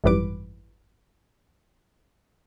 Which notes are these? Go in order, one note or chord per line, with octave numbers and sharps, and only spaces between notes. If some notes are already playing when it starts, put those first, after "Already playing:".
G#1 F#2 E3 G3 B4 D6